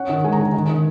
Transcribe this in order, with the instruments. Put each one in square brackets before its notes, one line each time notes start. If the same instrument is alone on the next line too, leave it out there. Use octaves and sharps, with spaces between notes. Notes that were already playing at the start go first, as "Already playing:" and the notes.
Already playing: [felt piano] C#4 F#5
D#3
G#3 G#5
A#5
D#3 G#5
D#3
D#3